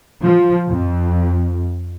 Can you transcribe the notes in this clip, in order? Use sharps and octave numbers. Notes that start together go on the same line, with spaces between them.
F3
F2